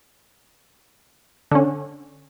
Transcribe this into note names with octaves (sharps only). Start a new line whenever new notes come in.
D3 C#4